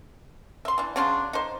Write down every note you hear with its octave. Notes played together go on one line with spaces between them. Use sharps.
E5 C6
E3 D4
C#3 F#3 D4 C6
D#4 C5